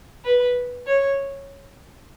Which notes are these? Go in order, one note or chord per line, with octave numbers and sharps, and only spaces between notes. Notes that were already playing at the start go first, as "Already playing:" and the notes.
B4
C#5